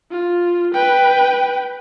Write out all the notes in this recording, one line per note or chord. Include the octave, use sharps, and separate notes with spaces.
F4
B4 G5